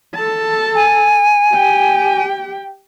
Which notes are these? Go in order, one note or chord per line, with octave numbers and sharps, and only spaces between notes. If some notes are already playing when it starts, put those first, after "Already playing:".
A4 A5
G#5
G4 G5